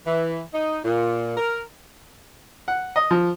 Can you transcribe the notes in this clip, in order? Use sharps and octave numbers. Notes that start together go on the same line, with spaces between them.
E3
D#4
A#2
A#4
F#5
D#5
F3